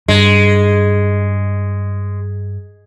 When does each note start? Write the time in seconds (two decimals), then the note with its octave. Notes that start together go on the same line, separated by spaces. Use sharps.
0.08 G2 G#3